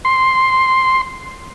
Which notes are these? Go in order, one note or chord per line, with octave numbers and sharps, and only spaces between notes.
C6